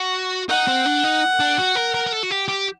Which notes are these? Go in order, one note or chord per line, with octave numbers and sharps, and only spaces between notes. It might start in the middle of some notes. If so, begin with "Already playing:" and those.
Already playing: F#4
D#4 F#5
C4
D4
D#4
D4
F#4
A#4
A#4
A#4
A4
F#4
G4
G4